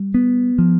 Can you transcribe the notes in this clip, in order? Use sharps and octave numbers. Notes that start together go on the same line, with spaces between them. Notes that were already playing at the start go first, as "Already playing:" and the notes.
Already playing: G3
B3
F3